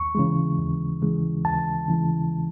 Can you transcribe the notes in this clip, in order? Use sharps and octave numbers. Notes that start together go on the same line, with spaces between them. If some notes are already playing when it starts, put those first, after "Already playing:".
Already playing: D#2 C#6
C#3 E3 G#3
D#2
C#3 E3 G#3
D#2 A5
C#3 E3 G#3